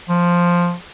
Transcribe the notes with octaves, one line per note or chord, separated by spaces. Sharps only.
F3